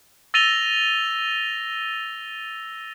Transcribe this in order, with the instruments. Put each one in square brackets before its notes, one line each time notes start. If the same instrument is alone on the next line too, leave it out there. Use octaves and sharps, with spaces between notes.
[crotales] E6 A6 A#6 D#7 F7 G7